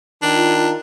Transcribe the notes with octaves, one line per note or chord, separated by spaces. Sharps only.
D#3 D4 F4